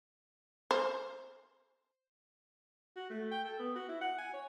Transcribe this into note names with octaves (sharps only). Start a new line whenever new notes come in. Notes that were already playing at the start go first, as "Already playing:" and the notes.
C5
F#4
A3
G5
A4
B3
F#4
E4
F#5
G#5
C#5